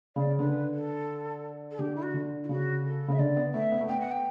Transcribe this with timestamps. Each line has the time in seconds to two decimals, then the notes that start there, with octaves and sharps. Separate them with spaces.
0.16 C#3 D5
0.39 D3 B4
0.74 A4
1.71 A4
1.79 D3 G4
1.96 E4
2.02 F#4
2.14 D3
2.44 E4
2.49 C#3 F#4
2.84 A4
3.08 C#3 E5
3.19 D3 D5
3.37 B3
3.54 A3 E5
3.72 B3
3.81 A3
3.89 B3 G5
4.00 F#5
4.11 G5